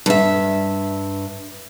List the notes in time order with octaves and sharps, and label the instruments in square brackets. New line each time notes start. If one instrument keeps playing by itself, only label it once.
[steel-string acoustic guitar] G2 E5